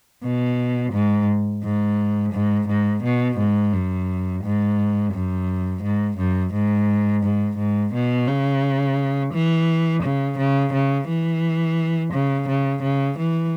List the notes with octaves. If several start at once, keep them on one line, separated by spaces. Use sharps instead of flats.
B2
G#2
G#2
G#2
G#2
B2
G#2
F#2
G#2
F#2
G#2
F#2
G#2
G#2
G#2
B2
C#3
E3
C#3
C#3
C#3
E3
C#3
C#3
C#3
E3